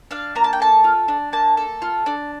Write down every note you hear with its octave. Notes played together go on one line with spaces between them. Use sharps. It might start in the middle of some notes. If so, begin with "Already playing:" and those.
D4 F5
A#3 A#5
A5
G5
A4 A5
F4
D4
A#3 A5
A4
F4
D4